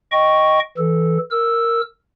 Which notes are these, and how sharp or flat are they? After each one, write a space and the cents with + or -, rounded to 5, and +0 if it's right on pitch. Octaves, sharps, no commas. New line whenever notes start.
D#5 +0 G5 -5 C#6 +0
E3 +0 A4 -10
A#4 -5 E6 +0